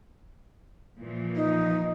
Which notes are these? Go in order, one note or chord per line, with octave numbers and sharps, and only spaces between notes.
A#2 E3 F3
D#4